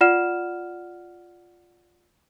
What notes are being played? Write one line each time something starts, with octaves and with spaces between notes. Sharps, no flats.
F4 D5 F#5 F6 E7